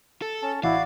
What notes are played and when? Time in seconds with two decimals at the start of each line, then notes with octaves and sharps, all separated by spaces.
0.22 A4
0.42 C#4 A5
0.64 A1 E4 F#4 D5 F5